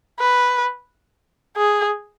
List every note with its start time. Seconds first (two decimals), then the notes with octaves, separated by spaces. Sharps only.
0.20 B4
1.57 G#4